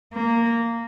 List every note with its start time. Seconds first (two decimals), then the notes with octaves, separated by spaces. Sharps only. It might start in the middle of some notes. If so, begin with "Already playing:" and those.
0.13 A#3